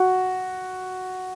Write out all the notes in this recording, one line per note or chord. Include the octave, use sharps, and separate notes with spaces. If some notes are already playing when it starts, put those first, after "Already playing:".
Already playing: F#4